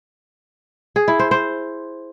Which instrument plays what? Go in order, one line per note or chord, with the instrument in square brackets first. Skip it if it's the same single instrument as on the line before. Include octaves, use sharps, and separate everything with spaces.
[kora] G#4
E4
C5
C5